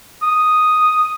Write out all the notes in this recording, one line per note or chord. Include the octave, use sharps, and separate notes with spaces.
D#6